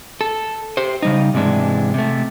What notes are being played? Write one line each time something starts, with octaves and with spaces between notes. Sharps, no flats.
A4
G4 C5
C#3 G3 D#4
G#2 C3 E3 G#3 D4
C3 A3